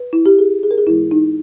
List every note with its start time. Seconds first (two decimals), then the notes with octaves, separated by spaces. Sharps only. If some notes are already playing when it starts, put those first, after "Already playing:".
Already playing: B4
0.13 E4
0.26 G4
0.39 G#4
0.63 G#4
0.71 A#4
0.78 G#4
0.87 G#2 E3 G#3 B3 E4
1.11 D#4